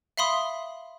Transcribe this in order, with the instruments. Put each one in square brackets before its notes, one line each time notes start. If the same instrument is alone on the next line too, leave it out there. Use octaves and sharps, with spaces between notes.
[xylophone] E5 F5 B5 C6 D#6